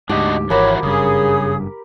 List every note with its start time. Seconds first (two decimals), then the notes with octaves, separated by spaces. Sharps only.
0.09 D2 G#2 D4 F#4 G4 D#5
0.50 G#1 E3 F3 F#4 A#4 C#5 B5 D6
0.83 F#1 G2 C#3 G#4 D#6